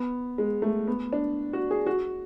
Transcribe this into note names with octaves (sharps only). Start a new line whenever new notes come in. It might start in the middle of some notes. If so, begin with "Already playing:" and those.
Already playing: B3
G#3
A3
B3
D4
F#4
G#4
F#4